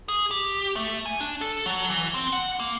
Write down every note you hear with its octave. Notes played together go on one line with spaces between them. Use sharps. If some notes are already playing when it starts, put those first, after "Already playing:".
G#4
G4
A3
G#5
D4
A4
F#3
E3
C4
F#5
A#3